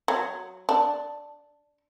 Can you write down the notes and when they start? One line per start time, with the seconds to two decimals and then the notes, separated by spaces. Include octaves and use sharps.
0.08 F#3
0.69 D4